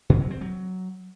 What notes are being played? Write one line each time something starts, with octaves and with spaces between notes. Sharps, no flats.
A#2
F#3
C4
F#3